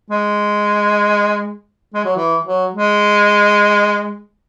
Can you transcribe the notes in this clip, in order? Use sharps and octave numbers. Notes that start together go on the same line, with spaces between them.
G#3
G#3
F#3
E3
F#3
G#3